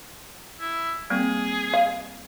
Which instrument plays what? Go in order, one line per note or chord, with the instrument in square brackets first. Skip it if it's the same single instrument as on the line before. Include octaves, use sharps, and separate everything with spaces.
[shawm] E4
[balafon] G3 A#3 C4 [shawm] G#4
[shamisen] F5